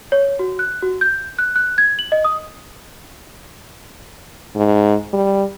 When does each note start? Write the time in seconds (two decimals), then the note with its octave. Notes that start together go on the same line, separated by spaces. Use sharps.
0.12 C#5
0.39 F#4
0.59 F#6
0.83 F#4
1.01 G6
1.39 F#6
1.56 F#6
1.78 G#6
1.99 F#7
2.12 D#5
2.24 D#6
4.56 G#2
5.13 G3